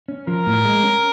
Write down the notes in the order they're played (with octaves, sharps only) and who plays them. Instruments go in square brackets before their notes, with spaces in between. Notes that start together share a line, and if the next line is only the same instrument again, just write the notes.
[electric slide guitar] C#4
[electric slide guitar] F3 [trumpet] A#4
[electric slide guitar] A2
G#3
C#4